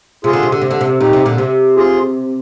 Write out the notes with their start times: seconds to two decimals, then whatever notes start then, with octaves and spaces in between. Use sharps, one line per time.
0.24 C3 F4 G#4
0.33 D3
0.43 C3
0.52 D3
0.61 C3
0.71 D3
0.81 C3
1.00 A#2 D#4 G4
1.13 C3
1.26 A#2 D3
1.38 C3
1.76 F4 G#4